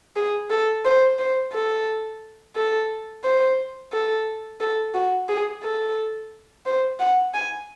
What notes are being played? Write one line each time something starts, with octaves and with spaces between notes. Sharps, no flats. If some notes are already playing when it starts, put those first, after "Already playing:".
G#4
A4
C5
C5
A4
A4
C5
A4
A4
F#4
G#4
A4
C5
F#5
G#5